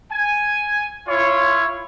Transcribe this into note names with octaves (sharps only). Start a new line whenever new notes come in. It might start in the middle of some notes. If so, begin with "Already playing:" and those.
G#5
E4 F4 C#5